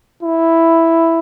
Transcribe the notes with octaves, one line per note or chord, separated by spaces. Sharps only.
E4